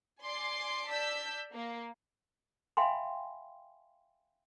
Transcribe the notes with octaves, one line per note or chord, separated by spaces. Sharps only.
D5 G#5 C6 D6 C7
D5 A5 E6 G6 B6
A#3
E5 F5 G5 G#5 B5 C6